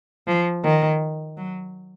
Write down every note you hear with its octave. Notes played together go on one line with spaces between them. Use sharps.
F3
D#3
F#3